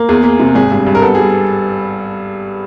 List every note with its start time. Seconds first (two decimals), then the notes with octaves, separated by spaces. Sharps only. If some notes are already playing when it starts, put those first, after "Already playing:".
Already playing: A#3
0.09 E2 G#4
0.24 A#3
0.40 C3
0.55 G#1 G#4
0.72 G2
0.87 G2
0.95 A#4
1.02 B3 A4
1.15 G3 G#4